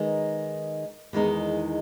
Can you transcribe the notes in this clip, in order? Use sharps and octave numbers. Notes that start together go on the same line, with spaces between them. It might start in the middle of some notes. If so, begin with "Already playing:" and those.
Already playing: D#3 G#3 B3 D#4
E2 D#3 G#3 D#4